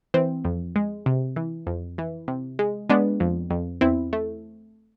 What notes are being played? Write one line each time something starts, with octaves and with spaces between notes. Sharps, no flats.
E3 C4
F2
G#3
C3
E3
F2
E3
C3
G#3
G#3 B3 D4
F2
F2
E2 C4 E4
A3